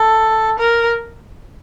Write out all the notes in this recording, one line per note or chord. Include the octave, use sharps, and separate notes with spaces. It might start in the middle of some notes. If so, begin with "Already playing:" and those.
Already playing: A4
A#4